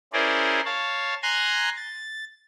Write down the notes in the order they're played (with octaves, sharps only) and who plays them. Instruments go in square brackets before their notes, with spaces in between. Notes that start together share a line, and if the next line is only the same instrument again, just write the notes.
[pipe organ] C#4 E4 G#4 A#4 C5 D5
C#5 F5 A5
G#5 A#5 C6 F#6 G#6 A#6
A6